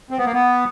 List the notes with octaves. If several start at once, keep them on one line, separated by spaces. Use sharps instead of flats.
C4
B3
A#3
B3